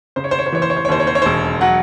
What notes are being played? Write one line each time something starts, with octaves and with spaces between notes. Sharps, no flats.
C#3 C5
C#5
C5
C#5
C5
E3 C#5
C5
C#5
C5
C#5
D#2 C5
C#5
C5
C#5
E1 C5
F#3 F#5